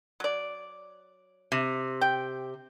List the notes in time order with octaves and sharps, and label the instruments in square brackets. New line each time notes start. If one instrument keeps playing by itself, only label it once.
[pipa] F#3 D5
[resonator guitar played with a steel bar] C3
[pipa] G5